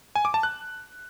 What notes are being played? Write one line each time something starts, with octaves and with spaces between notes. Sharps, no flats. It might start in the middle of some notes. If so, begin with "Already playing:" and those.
G#5
D6
A5
F#6